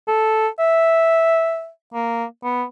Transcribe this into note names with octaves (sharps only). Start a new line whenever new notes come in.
A4
E5
A#3
B3